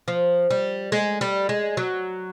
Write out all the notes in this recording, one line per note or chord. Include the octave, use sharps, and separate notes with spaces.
F3
G3
G#3
G3
G#3
F#3